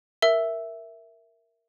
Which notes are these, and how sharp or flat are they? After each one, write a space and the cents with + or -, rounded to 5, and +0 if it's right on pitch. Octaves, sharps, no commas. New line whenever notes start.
A#4 +0 E5 +0 E6 +0